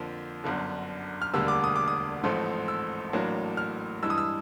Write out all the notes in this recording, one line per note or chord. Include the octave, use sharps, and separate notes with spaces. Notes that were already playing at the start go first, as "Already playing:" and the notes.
Already playing: F2 D3 F3 A#3
G1 F#2 D3
F6
E1 D2 D3 G3 A#3 E6
D6
D#6
D6
D#6
A1 G#2 F3 A3 C4
E6
A1 A2 F#3 A#3 D4
F6
G2 E3 G#3 E6
D#6
E6